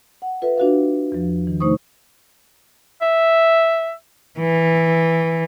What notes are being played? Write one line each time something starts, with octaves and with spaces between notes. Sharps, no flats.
F#5
F4 A4 B4 E5
D4 F4 F#4 A4 B4 F5
E2 F3
D#3
C3 A3 D#4 C5 C#6 D#6
E5
E3